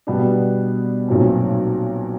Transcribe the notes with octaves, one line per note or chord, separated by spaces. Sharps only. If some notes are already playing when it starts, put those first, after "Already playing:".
B2 G3 B3 D4
B1 A#2 F#3 A3 C4